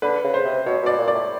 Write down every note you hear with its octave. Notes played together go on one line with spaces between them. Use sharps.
D3 B4
C#3
C5
C3
B2 C#5
B2 D5
A#2
D5
A2